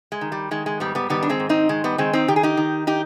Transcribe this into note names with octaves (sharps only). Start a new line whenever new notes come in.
G#3
D#3
G3
D#3 G#3
G#3
G#2 G3 B3
G3 B3
D#3 G3 B3
D4
G#3 C4
G#2
C4 D#4
D#3 G#3
G3 B3
D#3 G#3 C4
C4 D#4
D#3 G4
G#4
D#4 G4
D#3
D#4 G4